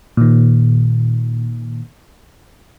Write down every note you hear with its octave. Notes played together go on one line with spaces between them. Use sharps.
A#2 D#3